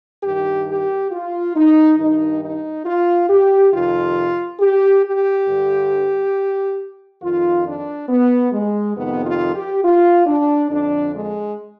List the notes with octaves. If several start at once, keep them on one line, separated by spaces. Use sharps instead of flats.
G2 D#3 G4
G4
F4
D#4
G2 D#3 D#4
D#4
F4
G4
F2 C3 D#3 F4
G4
G4
G2 D3
F2 D#3 F4
D4
B3
G#3
F2 C3 D#3 B3
F4
G4
F4
D4
F2 D3 D4
G#3